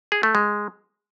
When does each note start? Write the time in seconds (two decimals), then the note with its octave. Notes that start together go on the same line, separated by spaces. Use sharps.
0.12 G#4
0.23 A3
0.35 G#3